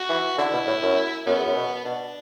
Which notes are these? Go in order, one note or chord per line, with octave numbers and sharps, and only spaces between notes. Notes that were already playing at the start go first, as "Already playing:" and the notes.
Already playing: F#4
E3
D3 E4
B2
A2
F#2
F#2 B3
E2
F#2
B2
B2 D4